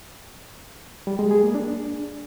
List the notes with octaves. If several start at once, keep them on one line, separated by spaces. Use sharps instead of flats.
G3
G#3
G#4
A#3
D4